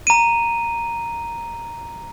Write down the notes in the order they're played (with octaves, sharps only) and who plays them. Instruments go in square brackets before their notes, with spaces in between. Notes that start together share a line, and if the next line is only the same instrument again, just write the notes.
[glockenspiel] A#5 D#7